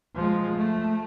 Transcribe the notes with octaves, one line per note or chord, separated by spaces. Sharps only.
F3 G#3
A3